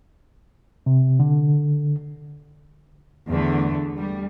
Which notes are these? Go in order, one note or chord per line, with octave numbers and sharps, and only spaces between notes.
C3
D3
E2 D3 A3
G3